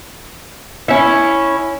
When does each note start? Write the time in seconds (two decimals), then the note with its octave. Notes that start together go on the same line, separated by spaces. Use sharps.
0.88 C#4 E4